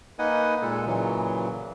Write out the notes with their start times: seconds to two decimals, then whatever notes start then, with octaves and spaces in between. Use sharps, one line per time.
0.19 A#3 D#4 B4 D#5 F#5 G#5
0.62 A#2 G#3 A4
0.86 A#2 C#3 E3 F#3